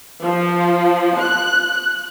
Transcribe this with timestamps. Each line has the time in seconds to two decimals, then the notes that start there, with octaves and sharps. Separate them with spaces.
0.21 F3
1.20 F#6